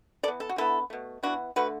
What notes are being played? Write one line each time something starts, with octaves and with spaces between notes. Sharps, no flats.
E3 B3 A4 D5
A4
F#4
D3 B3 E4 A4
B2 A3
E3 B3 D4 F#4
D3 A3 F#4 B4